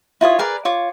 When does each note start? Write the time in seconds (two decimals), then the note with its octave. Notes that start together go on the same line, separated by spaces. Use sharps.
0.21 E4 F4 C#5 D#6
0.39 G#4 A#4 B4 D5
0.65 F4 C#5 D6